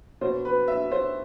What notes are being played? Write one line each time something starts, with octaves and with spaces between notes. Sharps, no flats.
B2 C5
B4
E5
C5